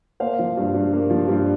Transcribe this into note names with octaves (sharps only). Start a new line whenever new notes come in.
A#3 C5 F5
F3
G2
G2
A#3
F3
G2